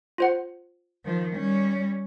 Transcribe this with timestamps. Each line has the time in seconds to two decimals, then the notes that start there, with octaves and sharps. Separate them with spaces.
0.18 F4 C5 F#5
1.05 D#3 F3
1.36 G3 C#4